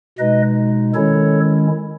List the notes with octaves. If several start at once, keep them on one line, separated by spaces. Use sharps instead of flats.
B2 G#3 D#4 B4 D#5
D#3 G#3 C#4 E4 A4 C#5